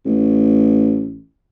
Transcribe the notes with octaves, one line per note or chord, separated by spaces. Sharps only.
A1